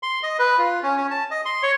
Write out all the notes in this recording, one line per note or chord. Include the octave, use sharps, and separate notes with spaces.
C6
D#5
B4
F4
C#4
C#4
A5
D#5
C6
C#5